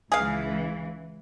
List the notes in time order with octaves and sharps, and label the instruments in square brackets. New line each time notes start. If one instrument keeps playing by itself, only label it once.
[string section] C#2 E3 [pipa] G#4 F5